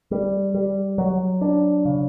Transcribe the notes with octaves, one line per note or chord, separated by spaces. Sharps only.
G3
G3
F#3
D4
C#3